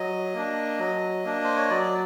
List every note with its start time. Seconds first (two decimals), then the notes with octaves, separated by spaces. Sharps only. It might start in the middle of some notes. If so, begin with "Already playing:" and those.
Already playing: F#3 D#5
0.34 A#3 D4
0.79 F#3
1.24 A#3 D4
1.44 C5
1.56 C#5
1.69 F#3 D5